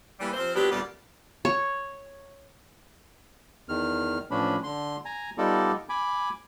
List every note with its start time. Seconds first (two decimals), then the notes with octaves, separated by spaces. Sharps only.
0.20 E3 G3 A#3
0.34 C3 F3 C4 C5
0.55 A#2 F#3 B3 D4 G4
0.70 D2 A#2 G3 A3 B3 D5
1.45 C#5
3.69 E2 D#3 F6
4.31 A2 E3 F3 C#4 D4 B5
4.63 D3 C6
5.05 G#5 A#5
5.38 G3 B3 D#4 F4 A4 D5
5.89 G#5 B5 D6